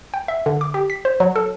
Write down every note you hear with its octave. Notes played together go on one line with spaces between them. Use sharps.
G5
E5
D3
D6
G4
B6
C5
F#3
A4